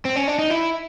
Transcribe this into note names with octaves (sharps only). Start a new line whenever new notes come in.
C4
C#4
D4
D#4
E4